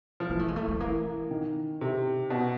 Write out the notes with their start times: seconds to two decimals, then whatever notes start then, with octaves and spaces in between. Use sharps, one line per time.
0.20 F3
0.29 E3 A#3
0.39 A3
0.48 G#3
0.56 A3
0.68 A3
0.80 E3 A#3
1.31 D#3
1.81 C3
2.30 B2